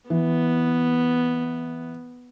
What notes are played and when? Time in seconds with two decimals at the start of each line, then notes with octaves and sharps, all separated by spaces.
0.10 E3 B3